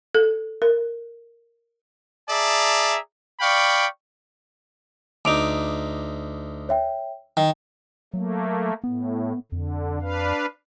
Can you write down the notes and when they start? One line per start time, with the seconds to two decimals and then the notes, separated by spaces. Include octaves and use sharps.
0.15 A4
0.62 A#4
2.29 G#4 D5 E5 A5 A#5
3.40 D5 F5 G5 B5 C#6
5.25 D2 D#4 D6 D7 F7
6.69 C#5 E5 G5
7.37 D#3 G5
8.14 F#3 A3 A#3
8.84 A2 B3
9.52 F2 D3
10.02 D4 B4 F5